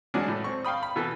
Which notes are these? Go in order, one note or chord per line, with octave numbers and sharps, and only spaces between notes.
E3 F#3 G#3 C#4 D4 F#4
A2 A3
C4 C#6
F5 G5 B5 D#6
B5
B2 E3 B3 A4